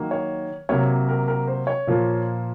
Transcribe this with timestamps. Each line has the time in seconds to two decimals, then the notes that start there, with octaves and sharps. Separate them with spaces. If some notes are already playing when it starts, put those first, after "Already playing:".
Already playing: D#3 F#3 A#3
0.11 C#5
0.69 C3 F#3 A#3 C#5
1.09 A#4
1.28 A#4
1.47 C5
1.67 C#5
1.87 A#2 F3 A#3